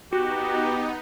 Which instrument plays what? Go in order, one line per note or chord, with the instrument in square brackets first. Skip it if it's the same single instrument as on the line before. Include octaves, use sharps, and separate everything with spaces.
[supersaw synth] B3 D#4 [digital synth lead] F#4 [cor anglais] G4